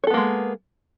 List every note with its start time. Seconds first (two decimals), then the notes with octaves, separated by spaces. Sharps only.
0.04 C#5
0.07 A4
0.10 B3
0.14 A#3
0.17 G#3